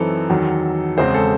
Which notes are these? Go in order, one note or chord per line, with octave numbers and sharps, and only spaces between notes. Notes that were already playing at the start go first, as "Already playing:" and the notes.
Already playing: F#2 E3 C4 D#4 A4
E2 D#3 F#3
E1 E2 C#3 G#3 C4 C5
A4